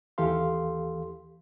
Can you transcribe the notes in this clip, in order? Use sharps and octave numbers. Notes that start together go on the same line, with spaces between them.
D#2 E3 G4 A4 F5 C6